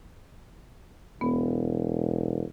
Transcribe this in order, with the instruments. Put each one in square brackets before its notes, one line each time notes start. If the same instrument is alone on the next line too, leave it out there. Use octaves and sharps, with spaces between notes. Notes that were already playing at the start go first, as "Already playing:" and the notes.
[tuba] E1 [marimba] B3